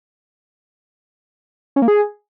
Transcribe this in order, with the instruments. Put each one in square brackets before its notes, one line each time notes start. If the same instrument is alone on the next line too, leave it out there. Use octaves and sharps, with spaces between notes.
[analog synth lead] C#4
A#3
G#4